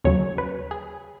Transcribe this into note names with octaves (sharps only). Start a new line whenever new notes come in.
D#2 C#3 F#3 C#5
B4
G#4